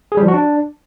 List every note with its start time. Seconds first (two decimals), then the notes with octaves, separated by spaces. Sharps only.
0.12 G#4
0.17 G3
0.23 F3
0.28 F#4
0.34 D4